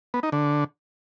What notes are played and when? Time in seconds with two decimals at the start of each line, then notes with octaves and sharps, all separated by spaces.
0.14 B3
0.23 D#4
0.32 D3